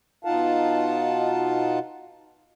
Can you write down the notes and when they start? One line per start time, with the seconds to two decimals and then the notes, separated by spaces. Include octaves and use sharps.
0.25 B2 D#4 F4 F5 F#5 A5